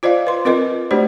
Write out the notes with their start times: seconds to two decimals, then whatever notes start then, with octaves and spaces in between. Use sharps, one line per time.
0.03 F4 C5 D5 D#5 F5
0.27 B4 C6
0.45 C4 F4 A#4 B4 D#5
0.91 A3 D4 F#4 G4 C5 D5